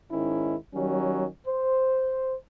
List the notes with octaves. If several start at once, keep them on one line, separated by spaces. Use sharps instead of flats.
G#2 D#3 C#4 E4
D#3 F#3 G3 C#4
C5